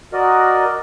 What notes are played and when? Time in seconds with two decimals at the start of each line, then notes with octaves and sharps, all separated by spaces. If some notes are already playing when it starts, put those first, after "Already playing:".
0.13 F#4 A#4 D5 D#5